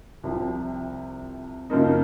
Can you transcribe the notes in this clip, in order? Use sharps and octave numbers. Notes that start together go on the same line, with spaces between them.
C2 C3 F3
F#2 C#3 F3 A#3 D#4